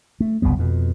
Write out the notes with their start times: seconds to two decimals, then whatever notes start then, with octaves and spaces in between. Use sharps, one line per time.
0.20 A3
0.42 F#1 C2 G3 B3
0.59 F2 B2